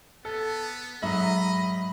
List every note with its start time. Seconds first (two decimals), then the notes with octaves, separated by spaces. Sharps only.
0.25 B3 A4
1.02 G#2 F#3 D#5 E5 A#5 B5